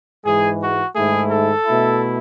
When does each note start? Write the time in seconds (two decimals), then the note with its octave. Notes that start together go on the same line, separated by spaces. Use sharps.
0.25 G#2 E3 G#3 G#4
0.61 F#4
0.95 G#2 D#3 A3 E4 G#4
1.31 A4
1.65 B2 A3 E4